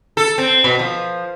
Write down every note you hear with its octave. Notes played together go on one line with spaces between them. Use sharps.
A4
C4
B2
F3